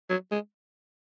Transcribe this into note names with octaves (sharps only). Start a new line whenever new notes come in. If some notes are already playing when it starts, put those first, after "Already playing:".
F#3
G#3